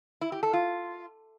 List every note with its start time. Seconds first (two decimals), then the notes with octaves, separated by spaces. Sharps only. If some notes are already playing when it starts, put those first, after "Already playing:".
0.21 E4
0.32 G4
0.43 A4
0.53 F4